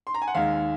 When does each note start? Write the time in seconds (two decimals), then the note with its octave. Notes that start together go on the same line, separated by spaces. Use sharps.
0.07 C6
0.14 A#5
0.22 G#5
0.28 F#5
0.35 D#2 D#3 G#3 F5